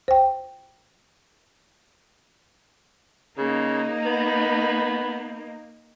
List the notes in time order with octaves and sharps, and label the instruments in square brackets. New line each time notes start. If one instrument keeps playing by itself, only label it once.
[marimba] C5 G5
[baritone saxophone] C#3 [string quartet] A#3 D#4
[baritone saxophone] B3 [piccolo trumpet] B5